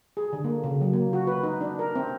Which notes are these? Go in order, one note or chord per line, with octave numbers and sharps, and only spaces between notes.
G#4
D3
A#3
C#3
F#3
A#3
F#4
B4
D#4
D4
A#4
C4